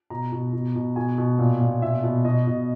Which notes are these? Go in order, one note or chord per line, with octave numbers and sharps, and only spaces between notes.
B2 A#5
B2
B2
B2
B2 G#5
B2
A#2
A#2
B2 E5
B2
B2 D#5
B2